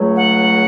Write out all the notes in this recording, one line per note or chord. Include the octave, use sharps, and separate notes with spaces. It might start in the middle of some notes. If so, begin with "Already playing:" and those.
Already playing: C#2 C#3 F#3 A3
F#5